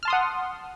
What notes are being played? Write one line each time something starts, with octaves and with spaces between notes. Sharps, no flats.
F#5 A5 C6 D#6 F6